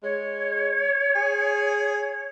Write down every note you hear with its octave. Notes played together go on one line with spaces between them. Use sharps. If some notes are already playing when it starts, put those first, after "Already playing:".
G#3 C#5
G#4